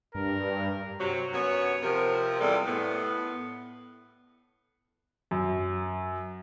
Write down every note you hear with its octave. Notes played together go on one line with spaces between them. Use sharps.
G2 A#4
C3 F#3
F#2 B3 F#4 C#5
C3 F3 A#4
E2 C3 G3 G#3 A4 D5
A2 B3
F#2